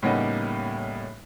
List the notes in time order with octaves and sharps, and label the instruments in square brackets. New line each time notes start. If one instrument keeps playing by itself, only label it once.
[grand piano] A2 C#3 G3 A#3 B3 D#4